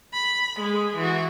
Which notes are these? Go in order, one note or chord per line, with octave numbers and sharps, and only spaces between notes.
B5
G#3 G#4
E3 F#4